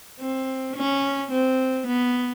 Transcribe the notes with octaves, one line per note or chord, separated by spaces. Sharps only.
C4
C#4
C4
B3